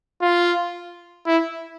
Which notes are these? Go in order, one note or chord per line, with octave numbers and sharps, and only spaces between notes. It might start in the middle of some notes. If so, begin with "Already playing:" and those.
F4
E4